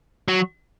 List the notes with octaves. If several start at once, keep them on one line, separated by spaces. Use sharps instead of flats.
F#3